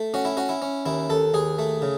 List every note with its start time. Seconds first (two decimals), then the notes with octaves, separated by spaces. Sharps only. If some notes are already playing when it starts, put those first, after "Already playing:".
Already playing: A3
0.14 C#4 F#4
0.25 E4
0.37 C#4 F#4
0.49 E4
0.62 C#4
0.86 D#2 E4
1.10 D#2 A4
1.34 D#2 G#4
1.59 A3
1.82 C#3